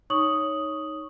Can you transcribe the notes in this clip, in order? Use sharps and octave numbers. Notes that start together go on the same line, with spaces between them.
D#4 C#5 C#6 D#6 F#7